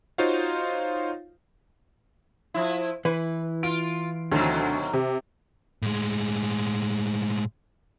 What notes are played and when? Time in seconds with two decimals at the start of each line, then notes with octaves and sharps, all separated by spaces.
0.18 D#4 F4 F#4 C5 C#5 F5
2.54 F3 E4
3.05 E3 E4 B4
3.63 F4 D7
4.32 D2 B2 D#3 F#3
4.93 C3
5.82 A2 G#3